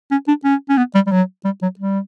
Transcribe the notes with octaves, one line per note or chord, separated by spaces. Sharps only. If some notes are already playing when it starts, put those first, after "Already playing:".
C#4
D4
C#4
C#4
B3
G3
G3
F#3
G3
F#3
G3